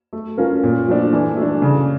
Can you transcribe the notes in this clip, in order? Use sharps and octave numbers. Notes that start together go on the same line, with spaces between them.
A3
C#4 F4 A#4
A#2
F3 A3 D4
E3
A3 D4
C#3